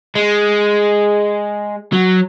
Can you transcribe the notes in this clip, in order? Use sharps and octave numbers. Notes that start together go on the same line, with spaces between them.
G#3
F#3